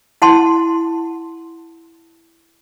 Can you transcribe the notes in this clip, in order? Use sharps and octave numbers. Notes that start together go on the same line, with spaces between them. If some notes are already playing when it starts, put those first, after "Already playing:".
E4 F#5 A5 C6